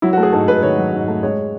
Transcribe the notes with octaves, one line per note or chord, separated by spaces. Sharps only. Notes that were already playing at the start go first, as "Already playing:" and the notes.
F#3 E4
F#4
A3
G#4
G#2 A4
G#2 B4
D#3 C#5
F#3
G#2
A3
G#3 C#5